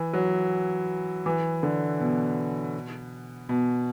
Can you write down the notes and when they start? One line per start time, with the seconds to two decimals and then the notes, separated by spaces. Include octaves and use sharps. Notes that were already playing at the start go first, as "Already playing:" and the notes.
Already playing: E3
0.14 F#3
1.26 E3
1.63 D3
2.00 B2
3.49 B2